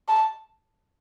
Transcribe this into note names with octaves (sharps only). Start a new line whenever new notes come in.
A5